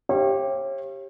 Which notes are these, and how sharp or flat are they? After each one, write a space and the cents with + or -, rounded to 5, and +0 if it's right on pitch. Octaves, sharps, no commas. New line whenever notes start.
G4 +0 C#5 -40 F5 -40